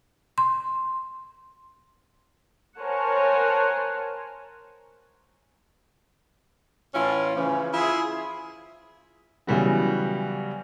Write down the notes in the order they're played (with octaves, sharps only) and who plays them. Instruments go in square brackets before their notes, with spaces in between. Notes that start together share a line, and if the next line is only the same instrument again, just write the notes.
[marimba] C6
[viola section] A#4 C5 C#5 F#5 G#5 A5
[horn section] A2 E3 C#4 E4 F4
C#3 E3 F3 C#4
E4 F4 G#4
[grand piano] C#3 E3 F#3 G3 B3 F#4